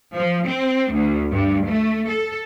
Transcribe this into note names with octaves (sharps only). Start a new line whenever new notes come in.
F3
C4
D2
G2
A3
A4